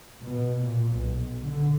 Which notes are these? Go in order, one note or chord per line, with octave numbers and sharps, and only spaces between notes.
B2
A#2
B1
D3